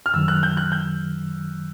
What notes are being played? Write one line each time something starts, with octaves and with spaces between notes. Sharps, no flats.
F6
F#2 D#3 F#3 E6
F#6
G6
F#6
G6